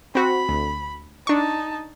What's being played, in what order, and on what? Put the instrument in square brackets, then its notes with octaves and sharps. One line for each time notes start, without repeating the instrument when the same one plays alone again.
[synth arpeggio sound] C4 F#4 [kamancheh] B5
[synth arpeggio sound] D2
[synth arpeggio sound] D4 C#6 [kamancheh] D#4 A5